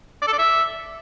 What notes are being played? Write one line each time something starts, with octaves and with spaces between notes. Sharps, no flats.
D5
A4
D5
E5